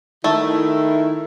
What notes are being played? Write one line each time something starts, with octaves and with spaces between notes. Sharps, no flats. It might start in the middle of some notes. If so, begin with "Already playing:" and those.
D#3 A3 E4